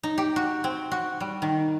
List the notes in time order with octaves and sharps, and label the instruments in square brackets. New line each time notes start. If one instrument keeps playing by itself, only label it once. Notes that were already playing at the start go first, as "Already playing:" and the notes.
[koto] D#4
G4
F#4
C4
F#4
G3
D#3